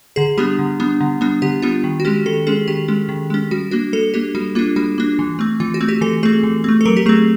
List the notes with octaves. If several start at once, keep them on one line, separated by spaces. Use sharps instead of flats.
D3 G#4
G3 B3 D4 G4
D3
G3 B3 D4
D3
G3 B3 D4
D3 G4
G3 B3 D4 F4
D#3
F#4
G#3 C#4 G4
D#3 A4
G#3 C#4 G#4
D#3 G4
G#3 C#4
D#3
G#3 C#4
G3 F#4
A#3 D4 F#4
G3 A4
A#3 D4 G4
G3 F#4
A#3 D4 F4
G3 F#4
A#3 D4
E3
A3 C4
E3 F4
F#4
A3 C4
G4
E3 A4
A3 C4 G#4
E3
A3 C4
A4
F#3 A#4
G4
A3 C4 G#4